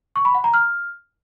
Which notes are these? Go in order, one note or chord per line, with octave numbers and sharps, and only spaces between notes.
C#6
B5
F#5
A#5
F6